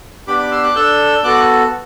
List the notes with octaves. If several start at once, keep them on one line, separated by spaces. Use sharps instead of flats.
B3 D4 G4 B5 D6
B5 D6
C6 E6
D6 F#6
D4 A4 E6 G6
B3 F#4 A4 D6 F#6